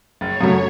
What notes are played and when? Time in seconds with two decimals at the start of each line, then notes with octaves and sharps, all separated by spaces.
0.21 F#1 C#5
0.41 F#2 C#3 F#3 A3